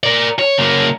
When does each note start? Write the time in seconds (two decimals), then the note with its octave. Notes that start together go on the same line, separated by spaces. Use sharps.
0.03 A#4 D5
0.39 C#5
0.58 C#3 A#3